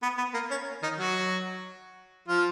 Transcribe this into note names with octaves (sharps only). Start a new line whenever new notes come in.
B3
B3
A#3
C#4
D#3 D#4
F#3 F#4
F3 F4